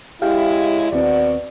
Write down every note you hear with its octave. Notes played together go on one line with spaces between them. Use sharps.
C#3 G#3 E4 G4 F5 G5
D#2 B2 C4 F#4 D5